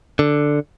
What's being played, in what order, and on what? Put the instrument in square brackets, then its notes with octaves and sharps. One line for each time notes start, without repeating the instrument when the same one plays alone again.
[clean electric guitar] D3